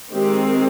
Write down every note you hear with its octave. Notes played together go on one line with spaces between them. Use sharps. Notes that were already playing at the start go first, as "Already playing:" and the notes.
D#3 G#3 C4 G4